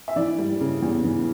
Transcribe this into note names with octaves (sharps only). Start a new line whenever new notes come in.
E5
E3 D5
G3
C#3
E2
E3